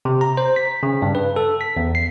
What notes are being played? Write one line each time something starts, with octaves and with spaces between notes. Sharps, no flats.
C3
A#5
C5
B6
C#3
G2
B4
A4
B6
E2
C7